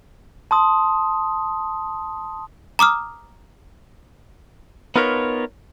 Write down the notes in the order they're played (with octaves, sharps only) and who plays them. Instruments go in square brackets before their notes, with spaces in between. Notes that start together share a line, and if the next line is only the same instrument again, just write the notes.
[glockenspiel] A5 C6 D#6
[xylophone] A#5 D6 D#6 F6
[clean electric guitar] B3 D#4 F4 A#4 B4 C#5